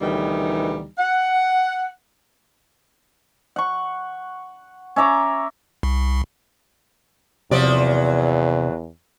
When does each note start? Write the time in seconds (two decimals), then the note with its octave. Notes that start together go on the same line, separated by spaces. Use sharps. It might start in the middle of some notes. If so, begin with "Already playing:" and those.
0.01 D2 B2 D#3 E3 G3 D#4
0.98 F#5
3.56 F#5 C#6
4.96 C#4 E5 A#5 D6
5.83 C2
7.51 E2 C3 F3 F#3 D5